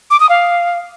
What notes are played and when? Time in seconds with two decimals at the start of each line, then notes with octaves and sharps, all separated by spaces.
0.11 D6
0.20 D#6
0.29 F5